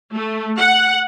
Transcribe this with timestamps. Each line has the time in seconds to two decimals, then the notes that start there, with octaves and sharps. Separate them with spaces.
0.15 A3
0.58 F#5